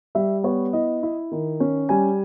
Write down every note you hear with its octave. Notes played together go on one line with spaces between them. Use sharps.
G3 E5
B3 C#5
E4 D#5
E4
D#3
C#4
G3 G#5